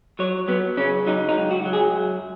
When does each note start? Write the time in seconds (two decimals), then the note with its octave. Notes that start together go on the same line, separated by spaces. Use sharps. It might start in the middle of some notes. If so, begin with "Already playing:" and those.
0.19 F#3 C#5
0.48 F#3 B3
0.77 C#3 C#4
1.07 F#3 D#4
1.29 D#4
1.36 C#2
1.51 F#4
1.65 F#3
1.73 G#4
1.94 F#2